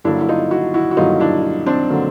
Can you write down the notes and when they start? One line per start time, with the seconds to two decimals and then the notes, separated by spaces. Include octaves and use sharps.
0.05 G2 D3 F#3 A#3 D4 E4
0.21 E4
0.28 D#4 F4
0.51 E4 F#4
0.74 E4 F#4
0.91 F#4
0.97 G2 D3 F#3 A#3 D#4 F4
1.20 D4 E4
1.66 C4 D4
1.89 D3 F#3 A#3